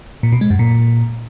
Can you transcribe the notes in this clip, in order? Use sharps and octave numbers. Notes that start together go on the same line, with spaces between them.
A#2
B2
G#3
F#2
A#2